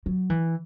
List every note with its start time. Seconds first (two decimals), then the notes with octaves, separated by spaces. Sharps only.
0.06 F#3
0.30 E3